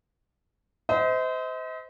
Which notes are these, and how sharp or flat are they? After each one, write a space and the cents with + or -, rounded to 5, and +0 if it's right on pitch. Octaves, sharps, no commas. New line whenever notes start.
C5 -30 D#5 +40